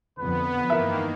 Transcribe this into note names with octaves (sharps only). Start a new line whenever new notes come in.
F2 D3 F3 B3 B4
G2 D#3 E3 A#3 A#4 E5